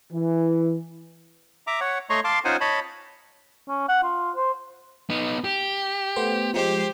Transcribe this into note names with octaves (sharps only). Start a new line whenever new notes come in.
E3
E5 A#5 D6
C#5 F#5
A3 C#5 D#5 A#5 C6 C#6
F5 A5 C6 D6
C#4 D#4 F4 C5 F#5 G#5
C#5 D#5 A5 B5
C#4
F#5
F4
C5
B3 D#4
G4
A3 B3 C5
F3 G#3 G4 C5